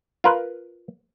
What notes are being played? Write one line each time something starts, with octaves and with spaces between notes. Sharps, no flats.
F4 A#4 B4